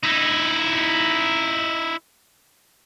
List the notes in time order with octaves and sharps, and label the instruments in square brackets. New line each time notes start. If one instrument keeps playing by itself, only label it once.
[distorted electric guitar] D#4 E4